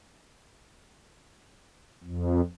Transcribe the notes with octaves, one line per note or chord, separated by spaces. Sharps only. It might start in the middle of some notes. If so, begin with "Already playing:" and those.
F2